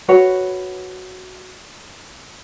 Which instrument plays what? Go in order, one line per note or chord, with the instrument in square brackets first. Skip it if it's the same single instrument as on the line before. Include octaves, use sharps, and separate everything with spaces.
[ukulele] F#4 B4 C#5